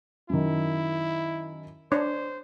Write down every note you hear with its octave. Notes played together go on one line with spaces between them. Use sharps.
F#2 D#3 E4
D4 C5 C#5